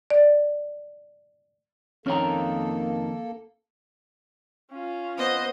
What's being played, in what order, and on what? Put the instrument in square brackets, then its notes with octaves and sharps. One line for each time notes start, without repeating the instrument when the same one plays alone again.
[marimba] D5
[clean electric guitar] F2 D#3 [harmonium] A#3 A4 [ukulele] C#4 A#5
[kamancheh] C#4 F4
[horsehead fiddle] B3 C5 [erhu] D#5